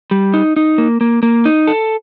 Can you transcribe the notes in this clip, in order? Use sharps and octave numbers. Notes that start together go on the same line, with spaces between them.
G3
D#4
D#4
A#3
A#3
A#3
D#4
A4